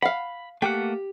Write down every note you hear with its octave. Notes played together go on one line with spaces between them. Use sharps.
F5 F#5 B5
A3 A#3 G4 F#5